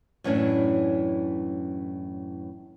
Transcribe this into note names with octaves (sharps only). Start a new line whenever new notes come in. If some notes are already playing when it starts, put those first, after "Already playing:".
F#2 A2 E3 C#4 D4